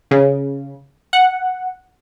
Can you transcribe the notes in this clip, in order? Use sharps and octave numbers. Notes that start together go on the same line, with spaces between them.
C#3
F#5